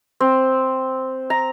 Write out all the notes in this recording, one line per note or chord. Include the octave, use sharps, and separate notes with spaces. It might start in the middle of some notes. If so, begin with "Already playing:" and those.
C4
A#5